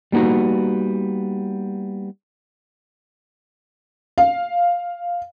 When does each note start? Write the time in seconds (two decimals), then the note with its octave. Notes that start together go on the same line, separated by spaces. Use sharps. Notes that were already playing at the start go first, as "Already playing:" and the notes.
0.12 G3 A#3 B3 D#4 F#4
4.18 F5